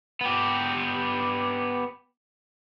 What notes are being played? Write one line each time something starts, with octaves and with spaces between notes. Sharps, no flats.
B3 G4